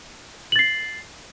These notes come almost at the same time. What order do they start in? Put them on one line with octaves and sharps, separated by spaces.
F#7 A6 C7